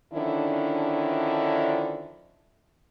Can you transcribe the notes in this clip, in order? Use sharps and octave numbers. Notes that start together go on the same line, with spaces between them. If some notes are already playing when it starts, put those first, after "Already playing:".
D3 D#3 F3 C#4 D4 E4